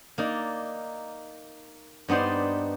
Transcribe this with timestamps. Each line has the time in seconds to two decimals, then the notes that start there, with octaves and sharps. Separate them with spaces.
0.18 A#3 D#4 D5
2.08 G2 B3 D#4 C5 D5